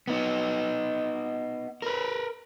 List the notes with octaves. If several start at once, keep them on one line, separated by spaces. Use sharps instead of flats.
B3 D#4
A#4 B4